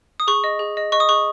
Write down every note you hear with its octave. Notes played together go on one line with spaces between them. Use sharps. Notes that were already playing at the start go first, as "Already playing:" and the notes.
D#6
G#4 C#6
D#5
G#4
D#5
D#5 C#6
D#6
G#4 C#6